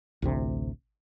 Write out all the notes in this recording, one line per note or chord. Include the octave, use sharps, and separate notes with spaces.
A1 D2 C3